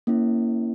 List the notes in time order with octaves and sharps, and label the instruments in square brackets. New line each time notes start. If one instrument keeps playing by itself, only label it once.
[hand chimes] A#3 C#4 E4